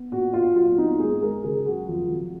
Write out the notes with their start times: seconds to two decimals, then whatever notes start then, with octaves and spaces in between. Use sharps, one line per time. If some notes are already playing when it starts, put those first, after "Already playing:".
Already playing: B3
0.12 A#2 F#4
0.33 A#2 F4
0.56 F#3 F4
0.77 B3 D#4
0.99 G#2 G#4
1.22 G#2 A#4
1.44 C#3 G#4
1.66 F#3 F#4
1.88 F2 F4
2.10 F2